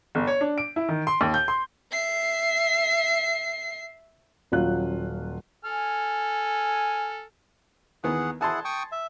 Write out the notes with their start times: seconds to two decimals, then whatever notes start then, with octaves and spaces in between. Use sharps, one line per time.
0.15 G1
0.27 C#5
0.41 D4
0.58 D7
0.76 E4
0.89 D#3
1.07 C6
1.21 D#2
1.34 G6
1.48 C6
1.92 E5 C7
4.52 D#1 F#3 F4 F#6
5.65 A4 G#5 F6
8.04 D#2 E3 B3 G#4 F#5
8.41 E4 G#4 F#5 G#5 A5 C6
8.65 G5 C#6 D#6
8.92 E5